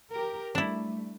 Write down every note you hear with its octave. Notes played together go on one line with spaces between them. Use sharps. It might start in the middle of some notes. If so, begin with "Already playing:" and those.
G4 A#4
G3 A3 D4 E4